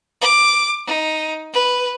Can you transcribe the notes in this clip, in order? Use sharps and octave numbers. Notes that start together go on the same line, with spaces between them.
D6
D#4
B4